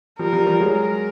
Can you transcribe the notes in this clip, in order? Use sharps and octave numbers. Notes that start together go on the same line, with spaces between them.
F3 G3 A#4
F3 G3
F3 G3
F#3 G#3
A#4